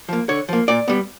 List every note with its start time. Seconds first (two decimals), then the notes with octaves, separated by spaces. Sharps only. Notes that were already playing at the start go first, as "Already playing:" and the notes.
0.09 F3 A#3
0.29 D3 C#5
0.49 F3 A#3
0.68 A#2 D5
0.88 G3 B3